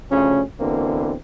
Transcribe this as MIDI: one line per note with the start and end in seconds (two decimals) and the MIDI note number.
0.11 0.41 38
0.11 0.41 49
0.11 0.41 53
0.11 0.41 61
0.59 1.13 47
0.59 1.13 50
0.59 1.13 52
0.59 1.13 58
0.59 1.13 60